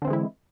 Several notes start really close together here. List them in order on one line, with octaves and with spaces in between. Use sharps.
D3 C4 E3 G#3 E4